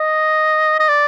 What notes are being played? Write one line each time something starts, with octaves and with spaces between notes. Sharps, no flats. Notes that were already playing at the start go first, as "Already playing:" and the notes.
Already playing: D#5
D#5
D5